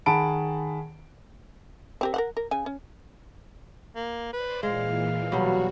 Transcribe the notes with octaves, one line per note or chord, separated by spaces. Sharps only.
D#3 G#4 F#5 A5 B5 D7
C4 G4 A#4
A#4 C5 F#5
A#4
C#3 G#5
C#4
A#3
B4 C5 D5
A#2 E3 G#3 F5
B2 F#3 G3 F#4